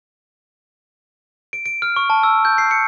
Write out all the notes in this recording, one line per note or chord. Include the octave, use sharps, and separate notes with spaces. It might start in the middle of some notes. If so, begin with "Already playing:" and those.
D7
D7
F6
C#6
A5
E6
G6
C7
C#7